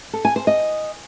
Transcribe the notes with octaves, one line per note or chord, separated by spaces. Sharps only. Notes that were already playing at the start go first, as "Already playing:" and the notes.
A4
G#5
C5
D#5